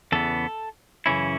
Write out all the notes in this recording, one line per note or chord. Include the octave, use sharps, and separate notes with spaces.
E2 C#3 E3 B3 A4
F#2 C#3 E3 C#4 E4